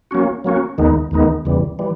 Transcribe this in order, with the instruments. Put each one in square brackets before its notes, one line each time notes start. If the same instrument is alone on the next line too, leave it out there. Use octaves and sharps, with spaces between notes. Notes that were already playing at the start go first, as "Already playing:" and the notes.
[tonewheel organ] F#3 A#3 C#4 F#4
F#3 A#3 C#4 F#4
D#2 D#3 G#3 B3 D#4
D#2 D#3 G#3 B3 D#4
E2 C#3 E3 G3
E3 G3